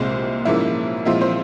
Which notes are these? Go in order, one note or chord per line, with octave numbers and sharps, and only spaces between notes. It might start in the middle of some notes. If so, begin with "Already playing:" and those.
Already playing: C2 A#2 G#3 C4 C5
G#2 F3 A#3 C#4 E4 E5
A#2 F3 G#3 C4 E4 F4 E5
C4 C5